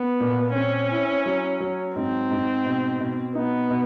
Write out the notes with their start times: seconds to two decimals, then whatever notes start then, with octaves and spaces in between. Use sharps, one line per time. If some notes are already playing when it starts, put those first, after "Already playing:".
Already playing: B3
0.20 A#2
0.56 C4 C#4
0.91 E4
1.26 F#3
1.60 F#3
1.96 G#2 C4
2.31 G#2
2.66 B2
3.00 B2
3.35 B3 D#4
3.70 B2